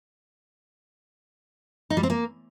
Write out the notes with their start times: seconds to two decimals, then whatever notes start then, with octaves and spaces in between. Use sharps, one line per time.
1.90 D#4
1.97 G3
2.03 C4
2.10 A#3